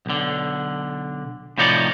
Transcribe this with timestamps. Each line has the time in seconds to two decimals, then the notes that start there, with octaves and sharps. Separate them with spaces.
0.06 B1 D3
1.58 A2 C3 F3 D#4 C#5 D5